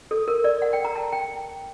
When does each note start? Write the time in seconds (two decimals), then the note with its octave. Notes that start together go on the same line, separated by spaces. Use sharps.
0.11 A4
0.28 A#4
0.44 D5
0.62 F#5
0.73 G5
0.85 A#5
0.95 A5
1.12 G5